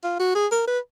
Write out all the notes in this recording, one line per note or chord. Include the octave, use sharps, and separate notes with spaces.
F4
F#4
G#4
A#4
B4